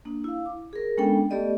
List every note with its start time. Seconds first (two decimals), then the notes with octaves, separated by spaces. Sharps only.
0.05 A#3 D4
0.24 E4 F5
0.46 D6
0.73 G#4 A#4
0.98 G#3 B3 C#4 D4 A4 G5
1.30 A3 B3 G4 A4 D5 D#5